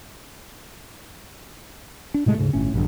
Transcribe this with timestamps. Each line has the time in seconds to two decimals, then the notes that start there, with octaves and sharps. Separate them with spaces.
2.14 D4
2.26 A2 C3 G#3 A3
2.38 D2 G#2 C#3
2.53 G1 A2 C#4
2.74 A#1 G2 D3